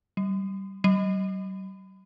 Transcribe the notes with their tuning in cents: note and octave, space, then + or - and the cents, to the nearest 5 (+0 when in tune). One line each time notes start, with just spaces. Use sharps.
G3 -20
G3 -45